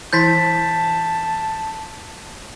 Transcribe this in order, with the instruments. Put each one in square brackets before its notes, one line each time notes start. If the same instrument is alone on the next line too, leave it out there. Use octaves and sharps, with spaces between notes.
[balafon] E3 E4 [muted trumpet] A5 [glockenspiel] G6 A6 B6